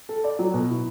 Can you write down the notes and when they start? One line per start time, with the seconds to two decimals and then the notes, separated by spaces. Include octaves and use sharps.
0.09 A4
0.24 D5
0.39 F#3
0.54 B2
0.69 E4